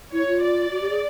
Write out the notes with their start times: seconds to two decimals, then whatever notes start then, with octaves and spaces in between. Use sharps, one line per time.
0.12 E4 C#5
0.27 F4
0.42 D5
0.72 F#4
0.81 G4
0.90 G#4